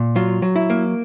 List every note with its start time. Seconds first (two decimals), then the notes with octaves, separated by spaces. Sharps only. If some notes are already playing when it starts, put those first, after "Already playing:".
Already playing: A#2
0.16 F#3 F4
0.42 F#3
0.56 E4
0.70 A#3